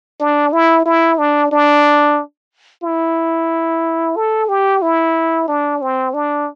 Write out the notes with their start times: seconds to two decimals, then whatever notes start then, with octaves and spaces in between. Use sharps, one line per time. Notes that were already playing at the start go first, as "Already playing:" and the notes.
0.20 D4
0.53 E4
0.86 E4
1.18 D4
1.52 D4
2.83 E4
4.16 A4
4.49 G4
4.82 E4
5.48 D4
5.82 C4
6.14 D4